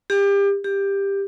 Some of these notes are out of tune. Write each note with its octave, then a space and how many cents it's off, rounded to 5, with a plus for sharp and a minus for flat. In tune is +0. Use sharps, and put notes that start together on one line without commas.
G4 +30
G4 +15